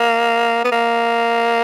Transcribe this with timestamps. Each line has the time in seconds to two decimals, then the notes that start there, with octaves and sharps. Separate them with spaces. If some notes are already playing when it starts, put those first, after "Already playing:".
Already playing: A#3
0.64 B3
0.72 A#3